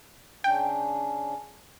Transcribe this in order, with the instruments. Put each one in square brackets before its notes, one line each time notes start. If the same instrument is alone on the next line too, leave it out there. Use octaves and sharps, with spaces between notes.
[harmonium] C#3 C#4 D4 [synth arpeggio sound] G5